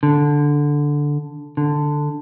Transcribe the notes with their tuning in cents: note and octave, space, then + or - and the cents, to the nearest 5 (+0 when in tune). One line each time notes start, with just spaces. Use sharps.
D3 -5
D3 +5